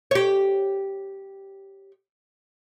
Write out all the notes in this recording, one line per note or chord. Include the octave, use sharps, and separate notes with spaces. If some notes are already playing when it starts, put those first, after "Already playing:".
G4 C#5